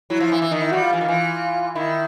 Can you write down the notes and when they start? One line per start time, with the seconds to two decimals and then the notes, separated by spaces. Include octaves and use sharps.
0.10 F#3 E4
0.20 F3
0.32 E3
0.42 E3
0.51 D#3 D#4
0.61 E4
0.72 G3 F#4
0.82 F4
0.93 E3
1.01 D#3
1.08 E3
1.75 D#3 E4